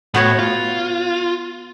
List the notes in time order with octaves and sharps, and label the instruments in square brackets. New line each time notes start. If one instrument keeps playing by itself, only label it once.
[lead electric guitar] A2 [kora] B3 F#4 C#5
[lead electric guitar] F4